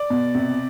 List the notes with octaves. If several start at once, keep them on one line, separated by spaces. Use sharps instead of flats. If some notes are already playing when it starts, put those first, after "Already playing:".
Already playing: D5
B2
C3